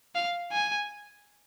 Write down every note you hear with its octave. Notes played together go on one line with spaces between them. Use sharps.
F5
G#5